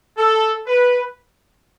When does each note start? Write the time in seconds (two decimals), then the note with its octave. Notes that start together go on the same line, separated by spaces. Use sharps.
0.18 A4
0.67 B4